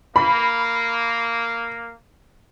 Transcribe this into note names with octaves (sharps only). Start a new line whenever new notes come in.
A#3 B5